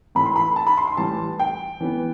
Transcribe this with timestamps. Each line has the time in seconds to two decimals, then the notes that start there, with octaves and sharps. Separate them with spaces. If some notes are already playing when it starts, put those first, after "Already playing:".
0.15 A2 E3 A3 B5
0.26 C6
0.36 B5
0.56 A5
0.67 B5
0.77 C6
0.87 C6
0.97 A2 E3 G3 A5
1.39 G5
1.80 E3 B3